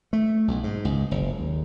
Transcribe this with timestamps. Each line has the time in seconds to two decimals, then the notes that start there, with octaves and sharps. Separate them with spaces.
0.13 A3
0.48 B1
0.64 G#2
0.85 C#2
1.11 F#1
1.40 D#2